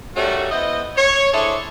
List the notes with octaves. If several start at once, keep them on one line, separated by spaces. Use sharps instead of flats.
D#3 G3 A3 C#4 F#4
B3 E4 C5 D#5
C#5
D4 E4 G#4 A4 C5 C#5